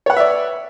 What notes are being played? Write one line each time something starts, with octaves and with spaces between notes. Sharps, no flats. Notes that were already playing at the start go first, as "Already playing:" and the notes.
B4 C#5 D5 E5 F#5